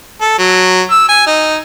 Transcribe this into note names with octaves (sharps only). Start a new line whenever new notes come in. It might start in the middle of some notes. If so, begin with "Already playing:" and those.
A4
F#3
E6
G#5
D#4